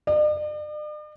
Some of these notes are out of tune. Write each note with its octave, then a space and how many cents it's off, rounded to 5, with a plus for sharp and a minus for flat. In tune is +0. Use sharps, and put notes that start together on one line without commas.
D5 +45